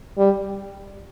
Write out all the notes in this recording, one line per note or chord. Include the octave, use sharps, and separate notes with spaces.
G3